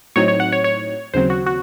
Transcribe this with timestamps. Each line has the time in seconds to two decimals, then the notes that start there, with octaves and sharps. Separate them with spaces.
0.16 A2 F#3 C4 D#4 C#5
0.28 C#5
0.40 F#5
0.52 C#5
0.64 C#5
1.14 D#2 C#3 F#3 C4 C5
1.30 F#4
1.46 F#4